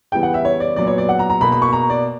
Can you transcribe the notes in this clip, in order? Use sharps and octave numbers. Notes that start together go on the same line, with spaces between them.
C#3 E3 G3 B3 G5
F#5
E5
C#5
D5
A#2 F#3 B3 D5
C#5
D5
F#5
A#5
A#5
B2 A#3 B5
B5
C#6
A#5
D5